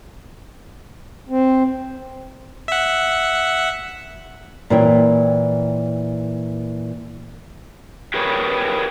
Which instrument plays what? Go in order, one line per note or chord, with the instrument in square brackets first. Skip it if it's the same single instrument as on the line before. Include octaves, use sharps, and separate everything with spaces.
[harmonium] C4
[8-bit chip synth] E5 F#5
[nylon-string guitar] A#2 E3 E4 C#5 G5
[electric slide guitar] G4 G#4 A#4 B4 C#5